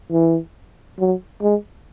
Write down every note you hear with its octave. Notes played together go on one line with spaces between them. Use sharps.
E3
F#3
G#3